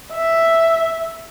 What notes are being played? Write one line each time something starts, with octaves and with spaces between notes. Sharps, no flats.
E5